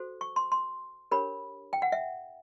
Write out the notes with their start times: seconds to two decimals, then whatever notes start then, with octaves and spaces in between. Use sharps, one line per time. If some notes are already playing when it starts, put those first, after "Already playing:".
Already playing: F#4 A4 C5
0.21 C#6
0.36 C6
0.52 C6
1.11 D4 G4 A#4 C#5 B5
1.73 G5
1.82 F#5
1.92 E5